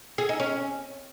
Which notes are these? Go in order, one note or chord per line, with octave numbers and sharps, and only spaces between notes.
G#4
D#4
C#4